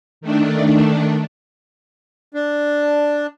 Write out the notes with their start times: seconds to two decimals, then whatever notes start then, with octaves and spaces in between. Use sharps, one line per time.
0.21 D#3 A3 D4
2.34 D4